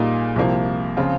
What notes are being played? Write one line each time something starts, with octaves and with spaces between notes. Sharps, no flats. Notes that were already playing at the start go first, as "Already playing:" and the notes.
Already playing: A#2 G3 A#3 D#4 G#4
C2 C3 F3 A#3
C#3 F3 C4 F4